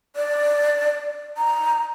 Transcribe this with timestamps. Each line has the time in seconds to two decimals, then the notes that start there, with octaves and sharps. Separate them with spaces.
0.16 D5
1.38 A#5